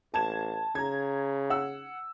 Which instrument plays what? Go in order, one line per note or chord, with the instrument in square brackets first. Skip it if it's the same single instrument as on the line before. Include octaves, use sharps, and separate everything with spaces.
[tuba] A1 [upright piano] A5 G#6 E7
[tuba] C#3 [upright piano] A#5 G#6
[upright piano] F#5 E6